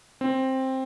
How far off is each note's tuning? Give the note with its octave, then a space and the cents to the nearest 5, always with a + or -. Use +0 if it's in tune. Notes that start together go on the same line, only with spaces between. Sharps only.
C4 +10